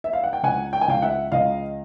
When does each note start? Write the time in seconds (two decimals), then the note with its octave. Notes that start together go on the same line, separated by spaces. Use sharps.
0.04 E5
0.13 F5
0.24 F#5
0.33 G5
0.43 C#2 F#5 G#5
0.73 G5
0.81 G#5
0.88 C#2 F5 G5
1.02 E5 F#5
1.32 C#2 D#5 F5